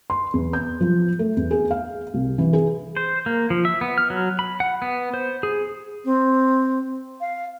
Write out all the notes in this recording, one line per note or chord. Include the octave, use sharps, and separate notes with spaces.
C6
E2
G6
F3
A3
E2
G#4
F5
C2
E3
G#4
C5
A#3
F3
E5
B3
F6
F#3
B5
F#5
B3
C5
G#4
C4
F5